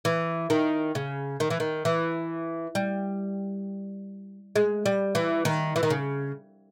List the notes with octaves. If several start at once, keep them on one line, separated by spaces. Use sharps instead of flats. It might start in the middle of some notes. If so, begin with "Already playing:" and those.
E3
D#3
C#3
D#3
E3
D#3
E3
G3
G#3
G3
E3
D#3
E3
D#3
C#3